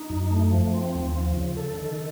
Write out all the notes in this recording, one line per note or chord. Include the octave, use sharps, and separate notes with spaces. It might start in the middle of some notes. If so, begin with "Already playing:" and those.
Already playing: D#4
F#2
A3
F3
C4
D#2
F3
C#3
A4
D#3